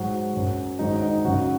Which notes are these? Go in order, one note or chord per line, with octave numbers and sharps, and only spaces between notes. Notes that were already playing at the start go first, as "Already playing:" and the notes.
Already playing: G#2 F#3 F#4
F#2 F#3
G#2 D#3 F#3 D#4
D#4
F#2 C#3 F#3 F#4